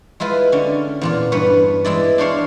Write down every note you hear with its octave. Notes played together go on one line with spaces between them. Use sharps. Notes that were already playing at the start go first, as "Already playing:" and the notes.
G#3 E4 F4 B4
D3 C#4
E2 A#2 F4
G2 B4 C#5
E3 G#3 E4 D5
D4 C5 C#5 F5